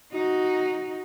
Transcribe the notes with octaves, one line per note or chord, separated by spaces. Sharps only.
D#4 F#4